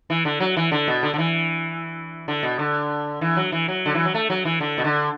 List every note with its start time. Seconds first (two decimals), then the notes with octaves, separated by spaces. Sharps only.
0.10 E3
0.25 D3
0.40 F#3
0.57 E3
0.72 D3
0.88 B2
1.03 D3
1.14 D3
1.18 E3
2.28 D3
2.43 B2
2.59 D3
3.21 E3
3.37 F#3
3.52 E3
3.68 F#3
3.86 D3
3.95 E3
4.05 F#3
4.14 A3
4.30 F#3
4.45 E3
4.61 D3
4.78 B2
4.84 D3